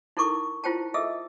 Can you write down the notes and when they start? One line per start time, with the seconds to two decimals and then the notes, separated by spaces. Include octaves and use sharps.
0.17 D#4 E4 A4 A#4 C#6 D6
0.64 E4 F4 C5 G5 A5
0.94 G#4 A4 D#5 E5 E6